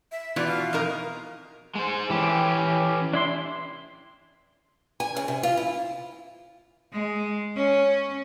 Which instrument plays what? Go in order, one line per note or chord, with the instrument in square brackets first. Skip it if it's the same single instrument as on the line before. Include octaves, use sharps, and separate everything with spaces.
[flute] E5
[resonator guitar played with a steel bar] B2 E3 F4 [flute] D5
[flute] F5
[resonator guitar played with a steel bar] F2 D#4 A#4
[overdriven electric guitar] G#3 C5
[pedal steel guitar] E3 [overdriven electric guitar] C#4 G4
[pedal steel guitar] D4 E4 C6
[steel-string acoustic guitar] G#5
C#3
C3
F4
E4
[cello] G#3
C#4